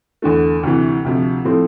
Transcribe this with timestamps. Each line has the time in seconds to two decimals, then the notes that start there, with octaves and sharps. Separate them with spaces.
0.22 E2 D3 A3
0.63 D2 C3 E3
1.05 D2 C3 F3
1.45 A2 F3 A3 C4